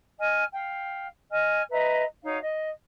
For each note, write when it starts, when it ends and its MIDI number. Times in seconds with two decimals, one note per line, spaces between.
0.20 0.44 75
0.20 0.44 80
0.20 0.44 89
0.52 1.06 77
0.52 1.06 79
1.30 1.62 75
1.30 1.62 80
1.30 1.62 89
1.70 2.03 71
1.70 2.03 75
1.70 2.03 76
1.70 2.03 82
2.23 2.37 63
2.23 2.37 66
2.23 2.37 73
2.23 2.37 77
2.42 2.69 75